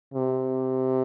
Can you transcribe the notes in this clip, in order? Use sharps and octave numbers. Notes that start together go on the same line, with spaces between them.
C3